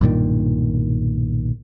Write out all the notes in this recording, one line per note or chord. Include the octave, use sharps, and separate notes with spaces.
B1 G2 A#2 D#3